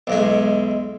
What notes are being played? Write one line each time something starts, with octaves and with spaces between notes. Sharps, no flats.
B1 E2 G#3